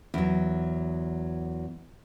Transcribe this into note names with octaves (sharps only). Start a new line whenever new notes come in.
E2 F#3